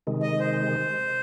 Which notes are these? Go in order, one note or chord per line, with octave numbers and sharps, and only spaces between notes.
C3 D#3 G#3
D#5
C5